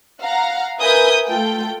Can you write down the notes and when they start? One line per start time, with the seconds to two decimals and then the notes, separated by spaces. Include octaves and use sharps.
0.21 F5 F#5 A#5
0.81 A#4 B4 E5 G#5 D#6 G6
1.27 A3 F4 A4 G5